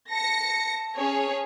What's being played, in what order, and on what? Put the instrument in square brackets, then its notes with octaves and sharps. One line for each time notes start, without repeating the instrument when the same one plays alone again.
[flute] A5 [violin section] A#6 C#7
[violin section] C#4 G#4 C#5